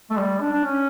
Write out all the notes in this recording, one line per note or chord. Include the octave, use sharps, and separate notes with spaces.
A3
G3
D4
D4
C#4